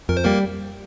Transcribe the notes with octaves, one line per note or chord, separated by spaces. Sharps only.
F2 A#4
C5
G3 A#3 A#4